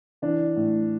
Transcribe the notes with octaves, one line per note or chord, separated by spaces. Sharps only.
E3 D4
A2